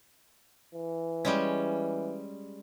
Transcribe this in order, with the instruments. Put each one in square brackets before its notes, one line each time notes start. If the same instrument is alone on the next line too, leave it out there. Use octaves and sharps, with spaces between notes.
[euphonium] E3
[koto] G3 G#3 C#4